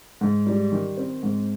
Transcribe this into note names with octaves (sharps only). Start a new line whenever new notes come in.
G#2
G3
D#3
C4
G#2